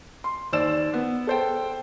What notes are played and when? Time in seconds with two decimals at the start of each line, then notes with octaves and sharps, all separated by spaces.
0.24 C6
0.53 D#2 C5 D5 E6 E7
0.94 B3
1.27 A4 C5 G5